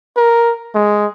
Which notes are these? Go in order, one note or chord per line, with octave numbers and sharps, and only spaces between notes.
A#4
G#3